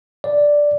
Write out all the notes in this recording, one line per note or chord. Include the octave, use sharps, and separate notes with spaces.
D5